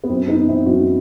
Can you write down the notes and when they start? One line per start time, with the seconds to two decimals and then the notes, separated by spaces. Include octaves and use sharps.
0.04 B3
0.09 F#2 C4
0.28 B3 D#4
0.38 E3
0.48 C4 E4
0.66 F#2 D#4 F#4